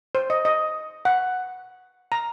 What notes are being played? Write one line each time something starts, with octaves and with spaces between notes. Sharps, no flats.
C5
D#5
D#5
F#5
A#5